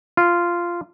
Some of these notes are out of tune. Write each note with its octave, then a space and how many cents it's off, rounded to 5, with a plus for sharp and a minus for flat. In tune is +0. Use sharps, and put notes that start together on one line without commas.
F4 -10